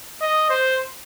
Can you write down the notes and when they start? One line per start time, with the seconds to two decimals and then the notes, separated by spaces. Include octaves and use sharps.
0.21 D#5
0.50 C5